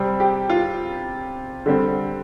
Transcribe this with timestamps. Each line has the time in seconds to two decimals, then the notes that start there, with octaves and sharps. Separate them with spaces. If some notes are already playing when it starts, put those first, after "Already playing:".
Already playing: C3 G3 C4
0.20 G4
0.50 F4
1.66 D3 G3 C4